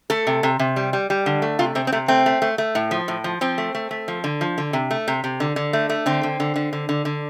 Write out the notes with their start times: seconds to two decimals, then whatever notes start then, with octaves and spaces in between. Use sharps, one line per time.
0.10 A3 A4
0.27 C3
0.43 C3
0.59 C3
0.76 G3
0.93 G3
1.10 G3
1.26 D3
1.42 A3
1.59 C3 F4
1.75 C3 C4
1.87 C4
1.92 C3 A3
2.08 A3 C4
2.26 A3
2.42 A3
2.58 A3
2.75 A2
2.91 F3
3.08 A2
3.24 F3
3.41 F3 C4
3.58 A3
3.75 A3
3.91 A3
4.08 F3
4.24 D3
4.41 F3
4.58 D3
4.73 C3
4.91 A3
5.08 C3
5.24 C3
5.40 D3
5.56 D3
5.73 A3
5.89 A3
6.06 D3 C4
6.23 D3
6.40 D3
6.56 D3
6.73 D3
6.89 D3
7.05 D3